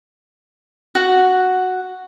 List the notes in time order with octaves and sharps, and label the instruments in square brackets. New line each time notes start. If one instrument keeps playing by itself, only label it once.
[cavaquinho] F#4 F#5